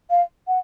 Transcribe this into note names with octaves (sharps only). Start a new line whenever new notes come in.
F5
F#5